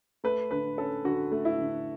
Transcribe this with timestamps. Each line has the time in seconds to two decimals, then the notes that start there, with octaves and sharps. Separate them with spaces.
0.24 A3 B4
0.51 D3 B4
0.77 C#4 A4
1.05 D3 F#4
1.32 A3
1.45 E4
1.58 D3